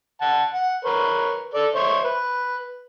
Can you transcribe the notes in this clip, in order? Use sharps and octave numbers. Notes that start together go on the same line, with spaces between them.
F#5 A5
F#5
A#4 B4 C#5
A4 D5
C5 C#5 E5
B4